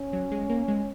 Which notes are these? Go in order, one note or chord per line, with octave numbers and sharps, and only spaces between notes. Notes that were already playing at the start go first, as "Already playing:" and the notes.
Already playing: C#4
F#3
G#3
A#3
G#3